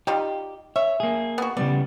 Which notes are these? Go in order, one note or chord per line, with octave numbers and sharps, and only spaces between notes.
G3 D#4 F4 G4
C#5 E5
A#3 G#4
B3 F#4
C#3 G3 B3 D5